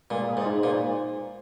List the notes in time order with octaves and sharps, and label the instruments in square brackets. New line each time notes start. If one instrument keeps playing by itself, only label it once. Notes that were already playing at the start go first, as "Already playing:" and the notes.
[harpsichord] A#2 [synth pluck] G#3
[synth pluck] G#4
[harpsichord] G#2
[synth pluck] D#4
[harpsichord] A#2 [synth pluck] C5